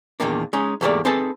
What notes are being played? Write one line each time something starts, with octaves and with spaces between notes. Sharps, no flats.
E2 A#2 D#3 A#3 D4
G#3 C#4 D#4
E2 G#2 A3 A#3 G4 D5
C4 D#4 G#4 A4 B4 A5